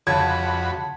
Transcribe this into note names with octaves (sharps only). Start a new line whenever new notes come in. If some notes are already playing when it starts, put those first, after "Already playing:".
F2 C#3 F#4 A5 B5 G#6